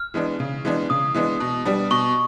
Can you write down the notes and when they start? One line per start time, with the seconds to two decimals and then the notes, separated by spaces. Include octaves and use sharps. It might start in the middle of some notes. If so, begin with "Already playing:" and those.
Already playing: F6
0.14 E3 G#3 B3 D4
0.40 C#3
0.65 E3 G#3 B3 D4
0.90 C#3 D#6
1.14 E3 G#3 B3 D4
1.40 B2
1.65 G3 B3 D4
1.91 B2 C#6